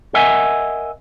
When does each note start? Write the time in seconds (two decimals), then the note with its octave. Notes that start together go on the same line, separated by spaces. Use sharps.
0.14 A#4 D#5 E5 F#5 G#5